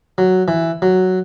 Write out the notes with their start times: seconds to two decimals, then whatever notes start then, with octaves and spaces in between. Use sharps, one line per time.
0.18 F#3
0.48 E3
0.82 F#3